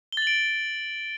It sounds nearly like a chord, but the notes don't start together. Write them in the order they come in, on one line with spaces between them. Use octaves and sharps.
G7 A6 F#7 D7